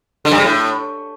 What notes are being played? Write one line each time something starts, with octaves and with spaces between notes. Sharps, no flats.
D3
G2
C#3
A2